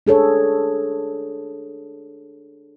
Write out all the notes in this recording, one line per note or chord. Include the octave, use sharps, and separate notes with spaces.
D4 G#4 A4 C#5